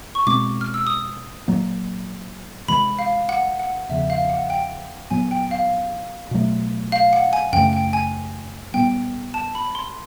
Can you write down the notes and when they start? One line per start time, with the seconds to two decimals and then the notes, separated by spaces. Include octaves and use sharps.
0.15 C#6
0.27 B2 G#3 C4 D6
0.61 F6
0.74 E6
0.87 D#6
1.48 A#2 F#3 A#3
2.68 C3 E3 G#3 B5
2.99 F5
3.29 F#5
3.59 F#5
3.89 E2 C#3 F3 E5
4.10 F5
4.30 F#5
4.50 G5
5.10 A#2 F#3 B3 G#5
5.31 G5
5.51 F5
6.31 B2 F#3 A3
6.92 F5
7.13 F#5
7.33 G#5
7.53 F#2 C#3 E3 A3 G5
7.73 G5
7.93 G#5
8.74 A#2 G3 B3 G5
9.34 A5
9.55 B5
9.75 C6